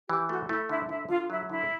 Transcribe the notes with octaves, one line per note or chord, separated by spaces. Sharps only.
E3 G4
A3 F#4
A3 E4
D3 E4
D3 E4
D3 F4
F#3 E4
D3 E4